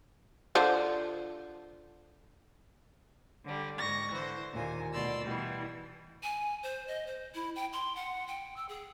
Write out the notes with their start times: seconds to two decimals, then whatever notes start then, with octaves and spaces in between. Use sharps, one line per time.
0.55 D3 F4 C5
3.44 D3 G3
3.79 G#2 C#6 A#6
4.13 D3 E3 C5
4.53 D#2 A#2 G#5
4.94 D2 B2 D5 C6 E6
5.25 B2 E3 G3
6.23 G#5
6.63 C5
6.87 D#5
7.07 C5
7.35 E4
7.56 G5
7.73 C6
7.96 F#5
8.28 G5
8.56 E6
8.69 G#4